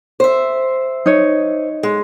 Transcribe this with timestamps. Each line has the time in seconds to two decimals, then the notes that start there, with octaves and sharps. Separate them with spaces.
0.20 C5 E5
1.06 D#4 C#5
1.83 G#3